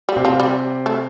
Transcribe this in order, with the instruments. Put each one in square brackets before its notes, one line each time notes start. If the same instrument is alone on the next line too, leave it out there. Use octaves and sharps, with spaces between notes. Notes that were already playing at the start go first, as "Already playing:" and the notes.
[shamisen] G3
[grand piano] C3 C4
[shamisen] F3
G3
A3